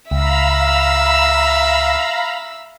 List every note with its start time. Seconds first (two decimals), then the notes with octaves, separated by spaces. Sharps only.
0.11 C#2 E5 F5 A#5 B5 E6